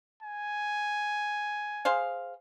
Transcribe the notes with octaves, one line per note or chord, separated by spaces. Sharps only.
G#5
G#4 C5 F5